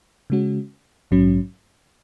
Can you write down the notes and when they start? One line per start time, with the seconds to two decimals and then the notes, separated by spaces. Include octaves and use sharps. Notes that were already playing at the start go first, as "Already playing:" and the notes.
0.30 C#3 G#3 C#4 F#4
1.11 A#1 G#2 F#3 C#4